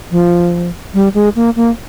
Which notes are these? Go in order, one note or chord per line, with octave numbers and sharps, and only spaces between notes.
F3
G3
G#3
A#3
A#3